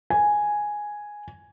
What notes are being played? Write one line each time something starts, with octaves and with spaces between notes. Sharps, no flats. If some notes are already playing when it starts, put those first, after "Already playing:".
G#5